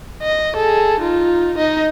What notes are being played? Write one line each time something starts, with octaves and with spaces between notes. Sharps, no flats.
D#5
G#4 A4
D#4 F4
D#4 D#5